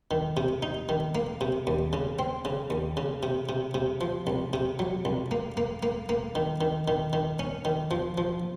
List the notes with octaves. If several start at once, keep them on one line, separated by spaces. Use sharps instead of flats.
D#3
C3
D#4
D#3
A#3
C3
D#2
C#3
C4
C#3
D#2
C#3
C3
C3
C3
F3
C2
C3
F#3
C2
A#3
A#3
A#3
A#3
D#3
D#3
D#3
D#3
C#4
D#3
F3
F3